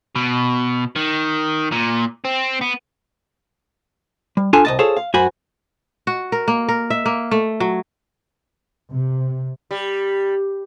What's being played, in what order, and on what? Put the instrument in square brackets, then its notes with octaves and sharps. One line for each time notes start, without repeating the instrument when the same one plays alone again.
[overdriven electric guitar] B2
D#3
A#2
C4
B3
[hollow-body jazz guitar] G3
D4 F4 A4 G#5 A5
C2 D#5 A5
F4 G#4 A4 C5 C#5 F5
F5
F#2 F#4 C5 G#5 B5
[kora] F#4
A#4
A#3
A#4
E5
A#3
A3
F#3
[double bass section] C3
[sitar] G3